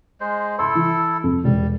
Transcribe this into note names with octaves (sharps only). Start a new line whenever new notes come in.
G#3 C5
E4 A4 C6
E3
F2
E1 G3